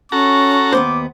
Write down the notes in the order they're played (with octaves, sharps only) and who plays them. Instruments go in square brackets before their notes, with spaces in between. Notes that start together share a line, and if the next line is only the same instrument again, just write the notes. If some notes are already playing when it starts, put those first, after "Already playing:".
[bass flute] C#4 [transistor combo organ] F#4 A4 A#5 [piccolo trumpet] C#6
[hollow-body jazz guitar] D#2 B3 C5 [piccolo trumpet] D6